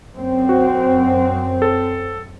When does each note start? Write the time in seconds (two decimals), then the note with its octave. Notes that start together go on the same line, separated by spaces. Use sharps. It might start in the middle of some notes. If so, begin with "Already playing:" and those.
0.17 F#2 C4
0.49 F#4
1.62 A4